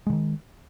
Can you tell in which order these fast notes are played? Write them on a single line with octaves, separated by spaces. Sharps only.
G#3 D3 D#3